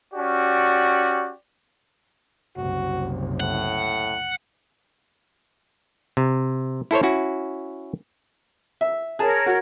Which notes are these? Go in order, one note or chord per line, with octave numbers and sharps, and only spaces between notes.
C#4 F#4 G4 D5
F#1 C2 F#4
A2 F#5
C3
E4 A4 C5 C#5
C#4 E4 F#4
E5
G#4 A#4 C#5 A5
F#4